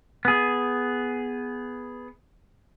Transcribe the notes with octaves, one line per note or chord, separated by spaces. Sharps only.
B3 G#4